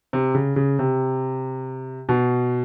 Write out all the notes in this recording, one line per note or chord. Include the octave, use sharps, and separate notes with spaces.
C3
C#3
C#3
C3
B2